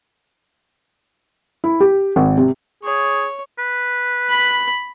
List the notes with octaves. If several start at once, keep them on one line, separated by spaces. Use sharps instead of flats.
E4
G4
G#1
C3
G#4 C#5
B4
B5